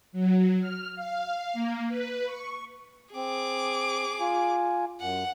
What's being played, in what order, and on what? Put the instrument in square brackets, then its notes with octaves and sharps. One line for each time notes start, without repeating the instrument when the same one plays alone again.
[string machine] F#3
F6
F5
A#3
B4
C#6
[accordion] C4 [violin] G#4 D6
[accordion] F4 G#5
[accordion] F#2 [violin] F#5